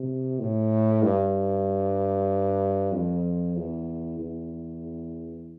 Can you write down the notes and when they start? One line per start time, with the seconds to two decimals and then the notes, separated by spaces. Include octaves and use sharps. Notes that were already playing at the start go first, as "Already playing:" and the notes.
Already playing: C3
0.39 A2
1.03 G2
2.92 F2
3.56 E2
4.19 E2